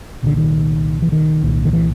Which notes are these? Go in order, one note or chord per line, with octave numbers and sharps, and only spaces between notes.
C2 A#2 D3
D#3
E3
D#3
C2 A#2
D#3
E3